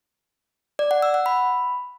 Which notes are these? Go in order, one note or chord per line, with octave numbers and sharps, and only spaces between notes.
D5
F#5
E6
F#5
B5